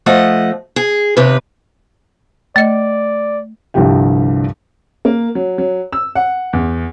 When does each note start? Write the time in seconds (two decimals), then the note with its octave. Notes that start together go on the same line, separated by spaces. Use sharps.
0.06 F3 A3 D#5 F#5
0.76 G#4
1.17 D#2 C3 B4
2.56 A3 D5 D#5
3.74 C2 G2 D3 F3 G4 G5
5.05 A#3
5.35 F#3
5.58 F#3
5.93 E6
6.15 F#5
6.53 E2